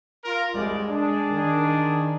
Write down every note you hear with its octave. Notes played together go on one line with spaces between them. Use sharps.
F4 A#4
C2 G#3 D5
D4 G#4
D#3